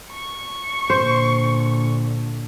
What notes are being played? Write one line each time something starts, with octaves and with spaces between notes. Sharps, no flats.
C#6
A#2 D3 C5